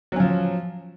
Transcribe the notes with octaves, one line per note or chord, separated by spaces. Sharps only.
F3 F#3 C#4